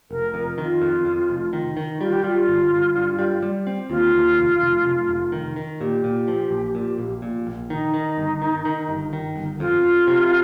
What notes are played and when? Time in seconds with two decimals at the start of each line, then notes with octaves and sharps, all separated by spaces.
0.11 F1 A#4
0.34 F2
0.58 D#3 F4
0.82 F2
1.05 F2
1.30 F1
1.53 D#3
1.77 D#3
2.01 G3 F4
2.13 G4
2.23 G3 F4
2.48 G1
2.71 G1
2.96 G2
3.19 G3
3.42 G3
3.67 C4
3.90 D#2 F4
4.14 D#2
4.38 F1
4.61 F1
4.85 F1
5.09 F1
5.32 D#3
5.56 D#3
5.80 A#2 G4
6.04 A#2
6.28 F3
6.51 A#1
6.75 A#2
6.98 A#1
7.22 A#2
7.47 A#1
7.69 D#3 D#4
7.94 D#3
8.17 G1
8.42 D#3
8.65 D#3
8.89 G1
9.13 D#3
9.36 G1
9.60 F2 F4
9.84 F2
10.07 C3